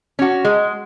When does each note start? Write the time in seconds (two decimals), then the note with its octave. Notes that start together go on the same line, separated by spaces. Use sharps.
0.19 C#4 F#4
0.45 G#3